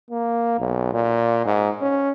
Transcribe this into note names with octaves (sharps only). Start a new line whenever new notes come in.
A#3
B1
A#2
G#2
C#4